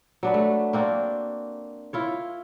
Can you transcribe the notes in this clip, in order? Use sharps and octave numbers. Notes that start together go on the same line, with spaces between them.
F#3 D4 B4
A3
A#3 C4 D4 F#4
E4 F4 C#5